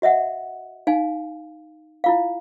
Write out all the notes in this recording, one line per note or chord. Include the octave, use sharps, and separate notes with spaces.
F#4 D#5 E5 F#5
D#4 F5 G#5
E4 F4 F5